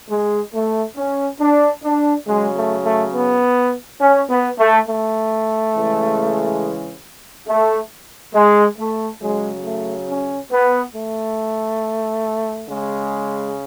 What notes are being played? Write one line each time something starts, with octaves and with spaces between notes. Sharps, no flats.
G#3
A3
C#4
D4
D4
C#3 F#3 G#3
A3
A3
B3
C#4
B3
A3
A3
C#3 E3 G#3
A3
G#3
A3
C#3 F#3 G#3
A3
C#4
B3
A3
C#3 G#3